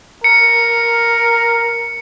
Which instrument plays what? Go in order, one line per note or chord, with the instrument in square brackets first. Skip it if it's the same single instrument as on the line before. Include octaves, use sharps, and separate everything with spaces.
[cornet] A#4 [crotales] C#7